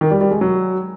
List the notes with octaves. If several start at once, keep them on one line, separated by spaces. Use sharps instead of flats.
D#3
G3
G3
G#3
F#3